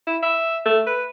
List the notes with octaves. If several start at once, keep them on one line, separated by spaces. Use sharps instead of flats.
E4
E5
A3
B4